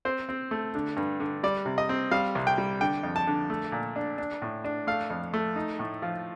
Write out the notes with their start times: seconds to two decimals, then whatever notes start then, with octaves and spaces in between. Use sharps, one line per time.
0.05 C4 C5
0.29 C4
0.51 A3
0.75 D3
0.97 G2
1.20 D3
1.43 G3 D5
1.66 C3
1.78 D#5
1.89 C4
2.11 G3 F5
2.35 C2
2.47 G5
2.58 G3
2.81 D3 G5
3.03 F2
3.16 A5
3.27 D3
3.50 A3
3.72 A#2
3.96 D4
4.18 D4
4.42 A2
4.64 D4
4.87 A3 F5
5.10 F2
5.34 A3
5.56 D#4
5.79 A2
6.02 F3